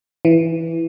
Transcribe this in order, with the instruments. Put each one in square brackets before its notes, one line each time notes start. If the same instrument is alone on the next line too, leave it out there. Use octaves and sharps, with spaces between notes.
[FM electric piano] E3